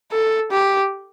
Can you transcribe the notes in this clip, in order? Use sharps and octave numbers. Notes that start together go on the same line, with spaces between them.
A4
G4